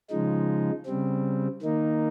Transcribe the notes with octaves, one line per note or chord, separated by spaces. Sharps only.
C#3 F3 G#3 D#4
C#3 G3 C4
D#3 A#3 D#4